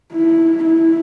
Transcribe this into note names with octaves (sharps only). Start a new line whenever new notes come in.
E4
E4